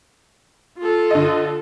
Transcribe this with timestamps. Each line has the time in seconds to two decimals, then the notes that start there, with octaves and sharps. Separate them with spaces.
0.79 F4 A4
1.11 D3 D#5